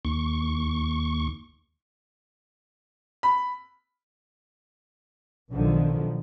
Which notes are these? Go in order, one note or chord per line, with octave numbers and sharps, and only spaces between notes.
D#2 C#6
B5
B1 D3 D#3 F3